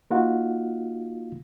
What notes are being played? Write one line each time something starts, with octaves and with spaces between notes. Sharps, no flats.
A#3 D#4 F4 F#4 F5 F#5